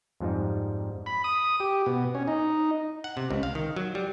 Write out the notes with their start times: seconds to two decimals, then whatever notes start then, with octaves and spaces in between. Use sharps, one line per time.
0.20 F2 G#2 F3 G3 D#4
1.06 B5
1.24 D#6
1.60 G4
1.86 B2
2.15 C#4
2.28 D#4
3.04 F#5
3.17 C3
3.30 C#2
3.43 F5
3.55 D#3
3.76 F#3
3.95 G3